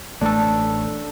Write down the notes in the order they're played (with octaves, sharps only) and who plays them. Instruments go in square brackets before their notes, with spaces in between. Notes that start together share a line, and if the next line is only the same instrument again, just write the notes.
[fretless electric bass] A1 A3 [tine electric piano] D4 A4